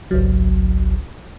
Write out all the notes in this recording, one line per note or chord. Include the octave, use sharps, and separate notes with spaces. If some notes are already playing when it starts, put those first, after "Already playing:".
G#1 C#2 F#3